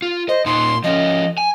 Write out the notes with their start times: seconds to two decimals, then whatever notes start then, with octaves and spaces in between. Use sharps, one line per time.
0.02 F4
0.29 C5 D#5
0.46 A#2 D#4 C6
0.84 F3 C#4 D#5
1.38 G#5